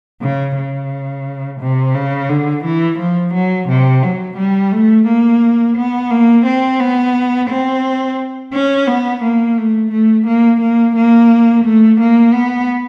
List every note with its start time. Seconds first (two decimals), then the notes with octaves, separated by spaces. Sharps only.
0.22 C#3
0.57 C#3
1.60 C3
1.95 C#3
2.29 D3
2.65 E3
2.99 F3
3.34 F#3
3.69 C3
4.03 F#3
4.37 G3
4.72 A3
5.07 A#3
5.77 B3
6.10 A#3
6.46 C4
6.80 B3
7.50 C4
8.53 C#4
8.87 B3
9.23 A#3
9.58 A3
9.92 A3
10.27 A#3
10.61 A#3
10.96 A#3
11.65 A3
12.00 A#3
12.34 B3